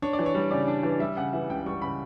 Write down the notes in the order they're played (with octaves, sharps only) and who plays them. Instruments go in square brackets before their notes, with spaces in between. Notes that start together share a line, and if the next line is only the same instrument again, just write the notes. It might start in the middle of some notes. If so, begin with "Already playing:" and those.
[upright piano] D4 C#5
D5
E3
C#5
G3
C#3 D5
D4
E3
G3 E5
C#3 F#5
E3 E5
C#2 G5
G3 C#6
C#3 B5